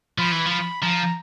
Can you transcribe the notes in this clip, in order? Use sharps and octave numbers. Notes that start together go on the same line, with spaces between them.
F3 B5
E3
F3 B5
F3 A#5